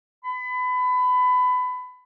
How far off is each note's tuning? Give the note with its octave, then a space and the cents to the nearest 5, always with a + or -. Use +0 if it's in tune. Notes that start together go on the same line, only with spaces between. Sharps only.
B5 +25